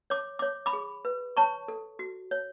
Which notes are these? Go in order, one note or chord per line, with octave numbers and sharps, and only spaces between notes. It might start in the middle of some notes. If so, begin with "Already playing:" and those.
C#5 D6
C#5 D6
B5 D6
G#4
B4
C#5 A5 C#6
A4
F#4
C#5